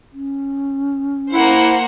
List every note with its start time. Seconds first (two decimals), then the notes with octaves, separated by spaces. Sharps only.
0.13 C#4
1.33 A#3 E4 C5 F#5